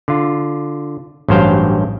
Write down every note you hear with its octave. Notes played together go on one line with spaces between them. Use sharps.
D3 F4
A1 G2 F#3 C5 F5 G5